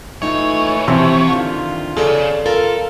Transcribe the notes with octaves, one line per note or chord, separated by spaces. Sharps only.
D#2 E3 A3 D#4 F4 C#5
C3 E3 F3
D3 D#3 F4
C#3 G#4 A4 D5
F4 A4 A#4